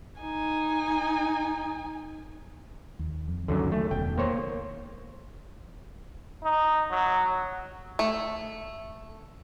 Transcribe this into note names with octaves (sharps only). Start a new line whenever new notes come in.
D#4 G#5
D#2
F2
C#2 F#2 D3 D#3
A3
E1 B2 D#3 G5
A#3 C5 C#5
D#4
F#3
A3